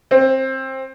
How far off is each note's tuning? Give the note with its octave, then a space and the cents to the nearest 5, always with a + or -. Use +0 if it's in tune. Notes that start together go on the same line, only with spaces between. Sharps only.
C4 +20